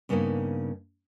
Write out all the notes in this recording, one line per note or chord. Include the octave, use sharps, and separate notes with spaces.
G2 C#3 A#3 B3 D4 D#4